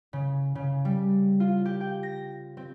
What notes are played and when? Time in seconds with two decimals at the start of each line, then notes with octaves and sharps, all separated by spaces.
0.13 C#3
0.55 C#3
0.85 G3
1.40 F4
1.65 G4
1.81 G5
2.03 A#6
2.57 C4